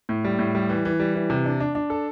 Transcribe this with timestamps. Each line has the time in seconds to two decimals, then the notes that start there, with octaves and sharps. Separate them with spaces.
0.09 A2
0.25 G3
0.39 A2
0.55 G3
0.69 E3
0.85 E3
1.00 G3
1.15 E3
1.30 C3
1.45 D4
1.60 D4
1.75 D4
1.90 A4